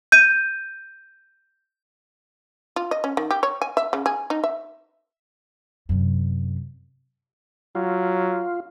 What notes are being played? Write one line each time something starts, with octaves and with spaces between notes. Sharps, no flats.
G6 D#7
F4
D#5
C#4
D#3
G4
C#5
G#5
E5
C#3
G#4
D#4
E5
F#2 C3
F#3 F4